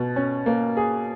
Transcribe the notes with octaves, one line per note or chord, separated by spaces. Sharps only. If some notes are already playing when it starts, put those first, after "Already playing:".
Already playing: B2
C#4
A#3
G#4